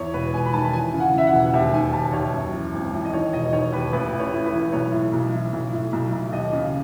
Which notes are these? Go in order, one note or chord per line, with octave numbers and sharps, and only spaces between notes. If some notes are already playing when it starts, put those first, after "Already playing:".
Already playing: E2 C#5
E1 B4
E1 G#5
B5
D#3 A5
A5
E3 G#5
C#3
F#5
E3 E5
F#5
E1
F#5
D#2 E5
D#3 G#5
D#2 A5
D#2 C#5
F#2
E3
G#1
E3
D#5
D#3 C#5
E1 D#5
D#3 C#5
D#2 B4
A1 B4
A1
C#5
A2
B4
E3
B1 C#5
A2
B1
E3
B1
A2
B1
B1
D#2 D#5
C#3 D#5